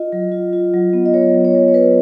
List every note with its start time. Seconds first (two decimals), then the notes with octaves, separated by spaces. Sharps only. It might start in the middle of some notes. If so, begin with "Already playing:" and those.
Already playing: F4 D#5
0.12 F#3
0.32 F4
0.53 F4
0.74 F#3
0.93 B3
1.06 D#5
1.14 F#3 C#5
1.34 F#3
1.45 C#5
1.55 F#3
1.68 C#5
1.74 F#3 B4